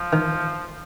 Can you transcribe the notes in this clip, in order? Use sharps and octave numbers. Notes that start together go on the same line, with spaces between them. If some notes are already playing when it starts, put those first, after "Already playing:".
Already playing: F3
D#3